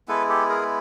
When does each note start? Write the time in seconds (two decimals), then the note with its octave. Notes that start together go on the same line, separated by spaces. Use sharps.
0.08 G#3 B3 E4 A4 B4
0.29 G4 A4
0.49 G#4 A#4